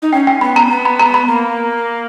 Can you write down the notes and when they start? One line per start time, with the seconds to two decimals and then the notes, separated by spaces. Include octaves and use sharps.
0.02 D#4
0.13 C#4 G5
0.27 G5
0.41 B3 B5
0.56 A#5
0.66 C#4
0.71 B3
0.85 B5
1.00 A#5
1.14 B5
1.28 A#3